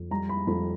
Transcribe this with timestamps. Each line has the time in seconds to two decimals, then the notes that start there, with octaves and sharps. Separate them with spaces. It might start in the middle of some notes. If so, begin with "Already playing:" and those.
Already playing: F2
0.11 G3 A#5
0.29 B5
0.47 F2 B5